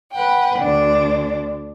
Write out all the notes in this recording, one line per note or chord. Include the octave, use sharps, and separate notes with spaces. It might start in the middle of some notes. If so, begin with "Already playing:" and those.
B4 F#5 G5
D2 D4